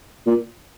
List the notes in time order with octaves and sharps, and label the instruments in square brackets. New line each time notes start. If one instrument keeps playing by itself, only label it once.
[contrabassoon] A#2